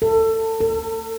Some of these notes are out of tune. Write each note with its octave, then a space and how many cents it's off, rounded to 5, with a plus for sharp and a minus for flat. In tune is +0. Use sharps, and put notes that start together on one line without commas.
A4 +25
A4 +45